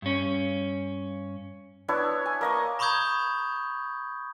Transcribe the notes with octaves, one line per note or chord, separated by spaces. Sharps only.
G2 C#4
B3 D4 E4 C#5
G#5
A#3 D#5 C#6
A#5 B5 C#6 D#6 G6 G#6